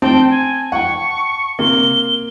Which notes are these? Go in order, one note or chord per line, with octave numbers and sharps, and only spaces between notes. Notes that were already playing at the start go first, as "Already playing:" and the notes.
C4 G5 A5
G#5
F#5 G5 C#6
C3 A#3 G7